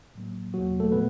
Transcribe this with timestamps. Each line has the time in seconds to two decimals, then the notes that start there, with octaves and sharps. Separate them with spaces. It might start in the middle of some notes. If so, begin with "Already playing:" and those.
0.15 A2 F#3 A#3
0.54 E2 B2 F#3 A#3 F#4
0.80 A3 A4
0.92 A#2 F3 A3 B3 B4